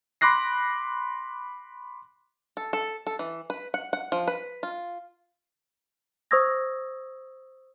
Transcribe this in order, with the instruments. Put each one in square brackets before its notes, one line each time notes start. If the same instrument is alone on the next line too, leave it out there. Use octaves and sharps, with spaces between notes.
[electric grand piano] B5 C6 D6 F#6 A#6 C7
[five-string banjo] A4
A4
A4
E3
B4
F#5
F#5
F3
B4
F4
[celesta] C5 C#6 D#6 E6 G#6 A#6